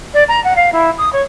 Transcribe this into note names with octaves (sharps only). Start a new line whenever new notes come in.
D5
A#5
F#5
F5
E4
D#6
C#5